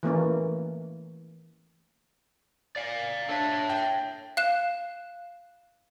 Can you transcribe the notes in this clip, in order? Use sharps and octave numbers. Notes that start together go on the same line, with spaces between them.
E3 A3 A#3 C#4
D5 F5
D4 A4 C#5 E5
G5
F5 F#6 E7